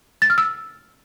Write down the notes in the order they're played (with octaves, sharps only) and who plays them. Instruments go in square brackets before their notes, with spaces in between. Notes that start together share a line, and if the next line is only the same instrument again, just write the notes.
[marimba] A6
F6
E6